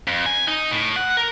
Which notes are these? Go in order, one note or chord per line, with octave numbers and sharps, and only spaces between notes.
F2
G#5
D#4
A2
F#5
A#4